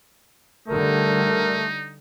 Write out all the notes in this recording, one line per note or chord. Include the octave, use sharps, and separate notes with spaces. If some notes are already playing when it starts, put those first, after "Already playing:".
D3 G3 A3 D#4 A#4